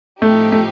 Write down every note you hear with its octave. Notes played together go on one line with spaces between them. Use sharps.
A2 F3 A3 C4 D#4 G4
A3